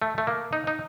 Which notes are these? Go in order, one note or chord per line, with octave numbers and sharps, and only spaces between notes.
A3
A3
A#3
D#4
D#4